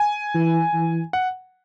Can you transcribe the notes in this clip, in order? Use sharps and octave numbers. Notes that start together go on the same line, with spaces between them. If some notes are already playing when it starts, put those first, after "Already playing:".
Already playing: G#5
E3
E3
F#5